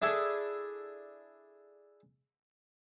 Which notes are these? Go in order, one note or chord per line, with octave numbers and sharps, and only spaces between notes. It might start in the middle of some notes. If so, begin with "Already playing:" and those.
D4 E4 G#4 A4